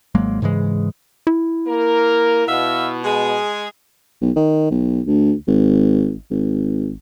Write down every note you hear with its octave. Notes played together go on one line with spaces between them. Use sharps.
G#1 F#3 G#3 A#3
G#2 C#3 E3 G#3
E4
A#3 A#4
B2 F#4 E5 F5
G#3 G#4
B1
D#3
B1
D2
G#1
G#1